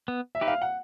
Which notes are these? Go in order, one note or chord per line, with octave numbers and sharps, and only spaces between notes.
B3
E5
D#4 G4 B4
F5
F#5